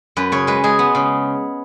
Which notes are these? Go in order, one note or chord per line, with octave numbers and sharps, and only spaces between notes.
F#2 B4
C#3 C#5
G#3 B4
G#3 G#4
B3
C#3